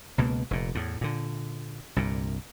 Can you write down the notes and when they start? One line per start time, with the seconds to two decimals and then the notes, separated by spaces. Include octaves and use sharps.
0.18 C#2 B2 A#3
0.51 F1 A#2
0.75 E2 A2
1.01 A#2 D3
1.96 C2 G2 A#2